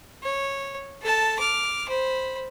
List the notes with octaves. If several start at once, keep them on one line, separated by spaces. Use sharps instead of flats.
C#5
A4 A5
D6 F6
C5 B5